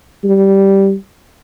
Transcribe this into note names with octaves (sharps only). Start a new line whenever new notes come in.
G3